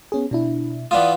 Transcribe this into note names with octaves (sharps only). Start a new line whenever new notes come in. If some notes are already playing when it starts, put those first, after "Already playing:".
B3 C#4 G#4
B2 D4 E4
E3 B3 F4 D5 D#6